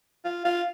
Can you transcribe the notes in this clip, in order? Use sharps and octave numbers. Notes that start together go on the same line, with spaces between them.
F4
F4